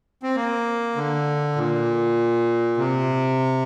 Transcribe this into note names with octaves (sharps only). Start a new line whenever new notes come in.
C4
A#3
D3
A#2
C3